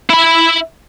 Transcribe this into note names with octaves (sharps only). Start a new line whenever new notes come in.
E4 B5